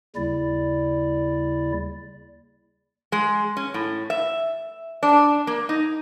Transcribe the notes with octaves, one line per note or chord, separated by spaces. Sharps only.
D#2 C#3 G3 E4 D5
G#3
C#4
A2
E5
D4
A#3
D#4